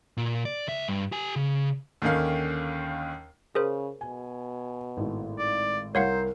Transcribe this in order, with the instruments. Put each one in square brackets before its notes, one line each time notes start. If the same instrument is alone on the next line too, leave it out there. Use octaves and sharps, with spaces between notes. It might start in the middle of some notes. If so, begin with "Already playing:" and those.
[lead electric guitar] A#2
D5
C#2 E5
G2
G4 G#5
C#3
[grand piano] D#2 D3 D#3 C#4 F5
[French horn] C#3 [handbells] G#4 A#4 C5
[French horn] B2 [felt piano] G#5
[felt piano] G#1 A2
[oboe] D5
[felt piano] C2 [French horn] A#4 [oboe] C5 [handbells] C#5 F5 F#5